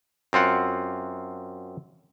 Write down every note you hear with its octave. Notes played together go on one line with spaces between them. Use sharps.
F#2 C4 F4 F#5